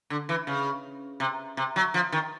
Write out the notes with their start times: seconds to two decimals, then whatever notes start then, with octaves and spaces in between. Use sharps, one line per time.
0.10 D3
0.29 E3
0.47 C#3
1.20 C3
1.57 C3
1.76 F#3
1.94 F3
2.12 D#3